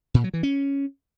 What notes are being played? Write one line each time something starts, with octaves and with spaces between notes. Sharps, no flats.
A#2
F#3
E3
C#4